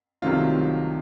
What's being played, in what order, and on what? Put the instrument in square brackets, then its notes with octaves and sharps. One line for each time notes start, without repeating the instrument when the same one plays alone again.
[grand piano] C2 C3 D#3 F#3 A3 F4